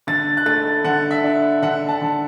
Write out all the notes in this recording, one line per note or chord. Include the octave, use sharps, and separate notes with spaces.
D3 A6
F#6
A3 A6
D3 F#5
E5
D4
D3 F#5
A5
D3